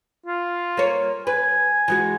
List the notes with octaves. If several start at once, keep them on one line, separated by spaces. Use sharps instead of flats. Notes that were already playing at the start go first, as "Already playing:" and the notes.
F4
A#3 C#5
B4 G#5
E3 G#3 F#4